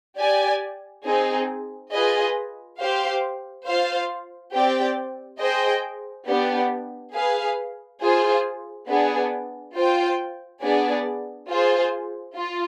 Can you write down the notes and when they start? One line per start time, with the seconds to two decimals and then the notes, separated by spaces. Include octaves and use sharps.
0.17 G4 D5 G#5
1.05 C4 D#4 G#4
1.91 F4 G#4 B4 D#5
2.79 G4 C5 F5
3.66 F4 C5 F5
4.53 C4 G4 D5 G5
5.40 G#4 C5 D#5 G5
6.27 B3 D4 G4
7.14 G#4 B4 F5
8.01 F4 G#4 C5
8.88 B3 D4 G#4
9.75 F4 C5 G5
10.62 B3 D4 G#4 D5
11.49 F4 G#4 C5
12.36 F4